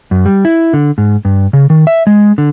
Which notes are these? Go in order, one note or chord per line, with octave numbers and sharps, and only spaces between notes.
F#2
G3
E4
D3
G#2
G2
C#3
D#3
E5
G#3
D3